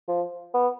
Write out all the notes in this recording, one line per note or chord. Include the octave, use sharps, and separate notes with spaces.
F3
B3